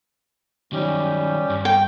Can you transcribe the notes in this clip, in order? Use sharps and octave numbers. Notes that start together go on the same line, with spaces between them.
D#3 F#3 G3 C#4 G4
G2
G5